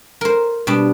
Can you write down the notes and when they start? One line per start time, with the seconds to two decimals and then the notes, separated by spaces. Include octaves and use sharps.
0.21 A#4 C5
0.67 B2 G3 D4